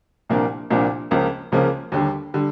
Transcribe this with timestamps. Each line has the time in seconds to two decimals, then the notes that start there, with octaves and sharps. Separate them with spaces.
0.29 C2 A#2 F3 A#3 D4
0.70 C2 A#2 F3 A#3 D4
1.11 C#2 C#3 F3 A#3
1.52 C#2 C#3 F3 A#3
1.92 D#2 D3 G3
2.34 D3 G3